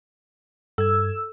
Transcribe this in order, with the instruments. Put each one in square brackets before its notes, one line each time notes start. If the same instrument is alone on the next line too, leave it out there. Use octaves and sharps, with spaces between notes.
[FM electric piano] G2 G#6 [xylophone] A4 [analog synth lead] E6